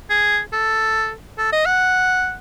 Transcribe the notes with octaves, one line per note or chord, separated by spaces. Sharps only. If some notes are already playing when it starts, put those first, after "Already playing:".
G#4
A4
A4
D#5
F#5